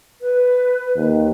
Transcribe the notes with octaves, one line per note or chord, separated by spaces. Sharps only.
B4
D#2